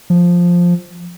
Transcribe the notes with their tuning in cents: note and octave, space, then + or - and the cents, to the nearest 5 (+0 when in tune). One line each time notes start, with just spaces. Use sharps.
F3 +5